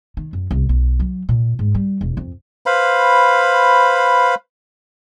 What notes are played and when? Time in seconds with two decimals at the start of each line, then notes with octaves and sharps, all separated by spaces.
0.17 D#3
0.33 F#2
0.51 C2
0.69 B1
1.00 F#3
1.29 A#2
1.59 G#2
1.75 G3
2.01 E1
2.17 F2
2.66 B4 C5 F5 B5